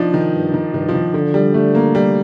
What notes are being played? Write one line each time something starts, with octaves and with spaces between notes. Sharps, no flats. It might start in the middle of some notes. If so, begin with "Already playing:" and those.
Already playing: F3 D4 D#4
D#3
G2
D#3
G2 D#3
F3
D#3
D3 F3
G3
A3
A#3
G3